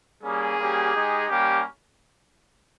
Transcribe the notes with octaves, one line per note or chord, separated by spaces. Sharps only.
G3 A#3 C#4 G#4
G3 A#3 C#4 G4
G#3 D#4 G4
G3 A#3 C#4 G4